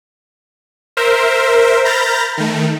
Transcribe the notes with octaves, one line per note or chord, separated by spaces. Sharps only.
A#4 C5 E5
A#5 B5 F6 G6 A6 A#6
D#3 A3